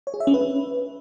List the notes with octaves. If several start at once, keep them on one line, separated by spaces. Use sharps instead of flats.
C#5
G#4
E5
C#4
B4